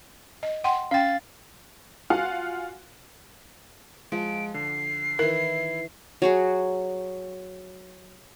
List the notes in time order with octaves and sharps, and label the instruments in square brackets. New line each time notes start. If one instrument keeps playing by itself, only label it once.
[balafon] D#5
F#5 G5 C6
[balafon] C#4 G5 [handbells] F5 A6
[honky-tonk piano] F4 F#4 F5 F#5 G#5
[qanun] F3 [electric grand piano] G#3 [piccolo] D7
[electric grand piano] D3 [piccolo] C7
[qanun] D#3 E3 [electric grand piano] E4 [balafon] A#4
[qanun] F#3 F#4 G#4